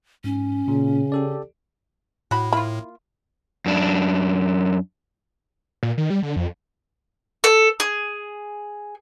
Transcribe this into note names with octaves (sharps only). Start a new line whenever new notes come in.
G#2 C#4
A#2 C#3
G4 A4 D5
A2 F#4 B5
A#3 E4 F4 B5
F#2 D4
A#2
D#3
G3
D3
F2
A4
G#4